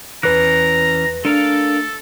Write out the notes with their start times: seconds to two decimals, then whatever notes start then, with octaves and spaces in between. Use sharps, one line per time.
0.23 E2 E3 C#4 B4 A#5 F#6
1.25 A3 D4 A4 A#4 F5